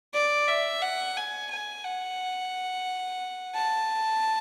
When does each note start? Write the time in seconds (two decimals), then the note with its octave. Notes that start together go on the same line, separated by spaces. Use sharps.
0.14 D5
0.48 E5
0.82 F#5
1.17 G#5
1.51 G#5
1.84 F#5
3.55 A5